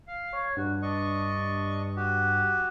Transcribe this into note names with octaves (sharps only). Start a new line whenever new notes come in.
F5
C#5
G2 F#4
D4 D#5 C#6
F#4 G4